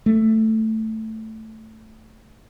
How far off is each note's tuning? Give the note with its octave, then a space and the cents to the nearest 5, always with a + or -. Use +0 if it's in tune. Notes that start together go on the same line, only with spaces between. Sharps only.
A3 +5